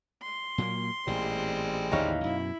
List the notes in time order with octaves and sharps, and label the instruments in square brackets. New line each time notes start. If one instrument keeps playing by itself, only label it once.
[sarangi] C6
[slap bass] A#2 F#3 A#3
[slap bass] A1 A#2 [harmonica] G3 G#3 C4
[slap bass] A1 D#2 D3 [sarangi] E3 [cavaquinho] D#4 C#5 F5
[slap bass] F#2 B2 [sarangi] E4